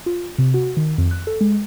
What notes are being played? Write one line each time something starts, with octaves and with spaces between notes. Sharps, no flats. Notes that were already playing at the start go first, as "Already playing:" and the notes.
F4
C3
F#4
D#3
F2
F#6
A4
G#3